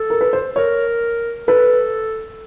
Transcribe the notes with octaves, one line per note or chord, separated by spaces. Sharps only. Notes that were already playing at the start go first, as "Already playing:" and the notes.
Already playing: A4
A#4
B4
C5
A#4 C#5
A4 B4